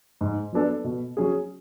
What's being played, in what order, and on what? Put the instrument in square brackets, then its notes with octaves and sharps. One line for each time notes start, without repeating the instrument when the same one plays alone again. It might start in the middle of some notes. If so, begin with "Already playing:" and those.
[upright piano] G#2
F#3 B3 D4 A4
B2
F#3 C#4 G#4